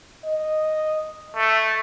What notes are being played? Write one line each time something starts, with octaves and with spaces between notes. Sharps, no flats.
D#5
A3